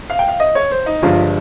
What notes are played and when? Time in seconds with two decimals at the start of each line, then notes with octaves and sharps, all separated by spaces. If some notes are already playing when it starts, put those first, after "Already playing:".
0.10 F5
0.19 G5
0.28 F5
0.40 D#5
0.55 C#5
0.71 C5
0.86 D#4
1.02 G1 G2 F3 G#3 F4